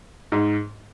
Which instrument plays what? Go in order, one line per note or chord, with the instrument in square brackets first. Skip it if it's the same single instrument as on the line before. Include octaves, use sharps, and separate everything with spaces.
[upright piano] G#2